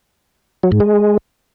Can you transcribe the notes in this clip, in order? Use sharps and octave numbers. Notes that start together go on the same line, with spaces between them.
F#3
G#2
G#3